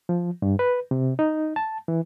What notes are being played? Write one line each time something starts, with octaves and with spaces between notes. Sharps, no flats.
F3
G2
B4
C3
D#4
A5
E3